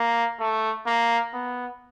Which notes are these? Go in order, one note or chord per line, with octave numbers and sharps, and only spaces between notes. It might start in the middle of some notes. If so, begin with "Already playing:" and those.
Already playing: A#3
A3
A#3
B3